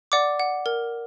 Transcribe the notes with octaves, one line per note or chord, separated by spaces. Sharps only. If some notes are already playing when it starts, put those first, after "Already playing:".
D5 F#5 D6
F#5
A#4